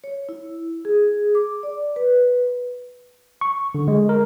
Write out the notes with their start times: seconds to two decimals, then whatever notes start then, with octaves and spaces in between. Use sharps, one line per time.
0.04 C#5
0.29 E4
0.85 G#4
1.35 D6
1.63 D5
1.96 B4
3.41 C#6
3.75 D3
3.88 G#3
4.09 A#4